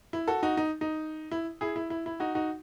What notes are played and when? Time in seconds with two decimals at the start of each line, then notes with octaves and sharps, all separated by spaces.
0.13 E4
0.28 F#4 A4
0.43 D#4 F#4
0.57 D#4
0.81 D#4
1.31 E4
1.61 E4 G#4
1.76 E4
1.90 E4
2.06 E4
2.20 D#4 F#4
2.35 D#4 F#4